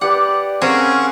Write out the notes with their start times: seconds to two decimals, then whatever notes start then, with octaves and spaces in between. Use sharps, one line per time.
0.01 G4 B4 D5 F#5
0.62 C4 C#4 G#4 A#4 F5 F#5 C#6